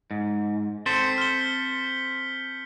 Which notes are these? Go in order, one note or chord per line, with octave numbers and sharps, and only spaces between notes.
G#2
C4 A4 C5 G6 B6 C#7
F6 G7